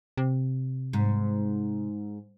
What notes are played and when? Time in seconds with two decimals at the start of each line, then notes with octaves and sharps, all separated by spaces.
0.17 C3
0.93 G#2